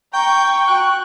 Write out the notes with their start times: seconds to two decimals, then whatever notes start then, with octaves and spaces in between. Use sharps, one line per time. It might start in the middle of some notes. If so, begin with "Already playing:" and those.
0.13 G5 A#5 C#6 G6
0.68 F#4 F#6